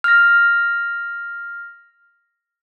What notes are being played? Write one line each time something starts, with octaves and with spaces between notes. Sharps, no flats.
F6 A#6